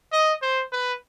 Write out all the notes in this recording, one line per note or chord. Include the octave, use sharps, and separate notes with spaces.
D#5
C5
B4